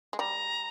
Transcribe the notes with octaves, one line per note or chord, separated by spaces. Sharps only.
G#3
G3 A#5